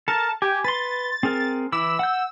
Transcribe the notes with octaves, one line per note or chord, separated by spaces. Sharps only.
A4 A#4 A5
G4 G#5
B4 C6 A6
C4 G#4 A#4
E3 E4 D6 E6
F#5 G6